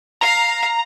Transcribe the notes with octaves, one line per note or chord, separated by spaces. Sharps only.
F5 A#5